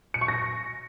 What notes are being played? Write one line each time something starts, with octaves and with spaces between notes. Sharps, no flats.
C#7
C#6
A#6